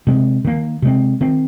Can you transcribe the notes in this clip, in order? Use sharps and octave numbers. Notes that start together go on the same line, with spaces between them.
C3 G#3 C4
D#3 A#3
C3 G#3 C4
D#3 C4